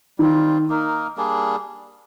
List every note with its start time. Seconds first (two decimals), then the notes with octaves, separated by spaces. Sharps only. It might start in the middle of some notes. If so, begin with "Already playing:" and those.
0.18 D#3 G3 C4 F4
0.68 A#3 D#4 A#4
1.17 G3 A#3 D4 G#4